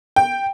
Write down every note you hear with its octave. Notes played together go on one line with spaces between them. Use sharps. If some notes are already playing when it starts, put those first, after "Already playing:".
G5